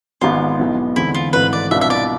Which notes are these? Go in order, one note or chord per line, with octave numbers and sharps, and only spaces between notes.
G#1 G#2 G#3 B3 F4
B1 B2 B3 E4
E2 D3 G#3 C4 E4
F4
G#1 G#2 E3 A3 C4 B4
D5
C2 B2 B3 D4 F4 E5
E5
D5